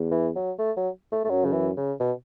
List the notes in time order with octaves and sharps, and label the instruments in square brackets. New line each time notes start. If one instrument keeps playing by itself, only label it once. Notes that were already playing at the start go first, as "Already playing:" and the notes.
Already playing: [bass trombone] E2
[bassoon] E3
F#3
A3
F#3
A3
A3
[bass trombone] F#2 [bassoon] F#3
[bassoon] C#3
E3
C#3
B2